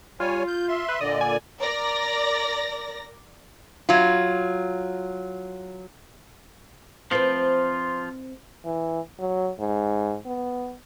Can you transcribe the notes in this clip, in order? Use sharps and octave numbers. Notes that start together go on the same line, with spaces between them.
G3 F4 C#5 G#5
G6
E5 C6
B4
A#2 D3 D5 D#5
G#5
A#4 D5 A#6
F#3 F4
F3 C4 E4 F4 B4
E3
F#3
G#2
B3